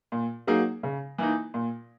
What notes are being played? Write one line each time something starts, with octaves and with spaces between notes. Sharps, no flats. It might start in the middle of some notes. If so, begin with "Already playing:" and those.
A#2
F#3 A#3 D#4 G#4
C#3
E3 A#3 D#4
A#2